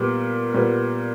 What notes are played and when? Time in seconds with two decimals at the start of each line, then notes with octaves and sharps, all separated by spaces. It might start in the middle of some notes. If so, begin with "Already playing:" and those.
Already playing: A#2 G3 B3
0.54 A#2 G3 B3